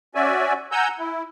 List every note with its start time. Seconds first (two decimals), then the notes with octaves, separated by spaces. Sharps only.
0.15 C#4 F#4 D5 E5 G#5
0.72 F#5 G#5 A#5 E6 G6
0.99 E4